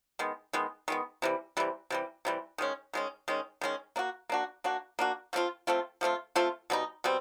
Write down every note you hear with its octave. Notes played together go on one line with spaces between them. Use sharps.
D#3 G#3 B3
D#3 G#3 B3
D#3 G#3 B3
C3 E3 G3
C3 E3 G3
C3 E3 G3
C3 E3 G3
D#3 G#3 C#4
D#3 G#3 C#4
D#3 G#3 C#4
D#3 G#3 C#4
A#3 D4 F#4
A#3 D4 F#4
A#3 D4 F#4
A#3 D4 F#4
F3 A3 C4 F4
F3 A3 C4 F4
F3 A3 C4 F4
F3 A3 C4 F4
B2 G3 C4 D#4
B2 G3 C4